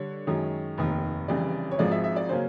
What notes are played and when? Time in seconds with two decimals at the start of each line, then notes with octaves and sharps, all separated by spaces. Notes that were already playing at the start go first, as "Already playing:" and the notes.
Already playing: D3 G3 C#5
0.27 F#2 D#3 G#3
0.78 F1 D#2 D#3
1.28 F1 F2 C#3 E3 G3 D5
1.71 C#5
1.79 G#1 G#2 F3 G#3 D5
1.91 E5
2.04 E5
2.16 D5
2.29 C#3 F#3 A#3 C#4 C5